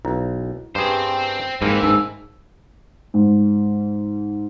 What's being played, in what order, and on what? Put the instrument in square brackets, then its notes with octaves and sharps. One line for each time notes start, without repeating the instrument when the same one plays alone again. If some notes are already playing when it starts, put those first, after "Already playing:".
[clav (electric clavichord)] B1 [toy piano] E4
[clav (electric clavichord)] G2 G#4 [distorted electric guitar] C4 C5
[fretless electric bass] G#2 [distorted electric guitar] E3 [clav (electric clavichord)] A#3 C4
[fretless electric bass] G#2 [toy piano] D#4 G#5 E6
[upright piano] G#2